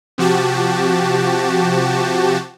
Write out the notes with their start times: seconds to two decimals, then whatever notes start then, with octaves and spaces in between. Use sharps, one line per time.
0.18 C3 F3 F#4 G4 A5